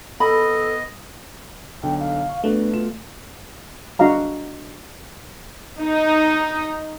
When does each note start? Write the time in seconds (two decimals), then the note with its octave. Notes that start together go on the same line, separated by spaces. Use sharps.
0.20 B3 A4 D#5 B5
1.83 B1 D3 G5
2.00 F5
2.29 C#6
2.44 A3 B3 D4 F#4 B4
2.73 B2 F4 E7
3.99 D4 F#4 D#5 F5 A#5
5.81 D#4